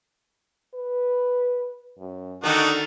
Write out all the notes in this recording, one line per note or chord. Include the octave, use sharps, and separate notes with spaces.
B4
F#2
D3 D#3 A3 D4 D#4 F#4